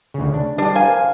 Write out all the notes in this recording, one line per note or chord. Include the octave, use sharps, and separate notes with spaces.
D2 C#3
D4
G3 D4 G4
A#4 C5 F5 G5 G#5